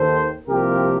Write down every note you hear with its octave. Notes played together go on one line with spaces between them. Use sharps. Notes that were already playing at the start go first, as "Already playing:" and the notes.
Already playing: D#2 D#3 A#3 A4 C5
C2 C3 F3 A#3 G4 A#4